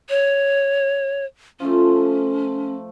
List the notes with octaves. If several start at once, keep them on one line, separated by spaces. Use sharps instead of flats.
C#5
F3 A3 C#4